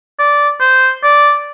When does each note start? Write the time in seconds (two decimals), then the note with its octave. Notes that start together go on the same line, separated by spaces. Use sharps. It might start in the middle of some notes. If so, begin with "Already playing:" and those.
0.19 D5
0.61 C5
1.04 D5